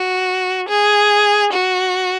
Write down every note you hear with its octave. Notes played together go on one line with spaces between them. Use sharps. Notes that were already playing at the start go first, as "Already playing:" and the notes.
Already playing: F#4
G#4
F#4